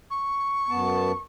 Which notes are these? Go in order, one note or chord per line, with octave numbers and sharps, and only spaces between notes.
C#6
F#2 B3 A5